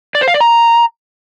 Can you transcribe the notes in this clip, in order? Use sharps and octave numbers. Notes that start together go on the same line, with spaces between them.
D5
C5
F5
D5
A#5